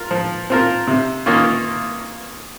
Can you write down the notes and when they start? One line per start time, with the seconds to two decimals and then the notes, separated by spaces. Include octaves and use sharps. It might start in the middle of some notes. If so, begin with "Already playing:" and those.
Already playing: F4 A#4
0.11 F3
0.50 C4 F4 A#4
0.87 C3
1.26 D#3 A#3 C#4 F4